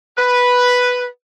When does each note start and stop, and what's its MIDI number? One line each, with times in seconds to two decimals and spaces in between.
0.17 1.03 71